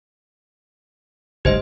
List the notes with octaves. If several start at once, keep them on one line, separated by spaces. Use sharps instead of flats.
F#1 G#2 G#3 G4 C5 D#5